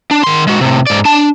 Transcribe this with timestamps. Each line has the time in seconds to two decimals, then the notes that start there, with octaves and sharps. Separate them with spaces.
0.11 D4
0.24 D#3 C6
0.47 G#3 F#4
0.61 A2 C3
0.87 G#2 D5
1.05 D4 A5